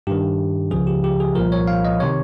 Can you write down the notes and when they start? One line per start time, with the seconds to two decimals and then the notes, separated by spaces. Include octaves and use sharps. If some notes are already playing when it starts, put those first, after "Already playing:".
0.07 G2 D#3 G4
0.71 C#2 C#3 F3 G#4
0.87 G4
1.04 G4
1.20 G#4
1.35 C2 A#2 F3 A#4
1.52 C#5
1.67 F5
1.85 D#5
2.00 C3 D#3 C#5